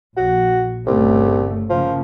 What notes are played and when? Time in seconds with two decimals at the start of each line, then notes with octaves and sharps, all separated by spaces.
0.17 A#1 F#4
0.87 G1 C2 C#3 A3
1.70 C#3 F3 A#3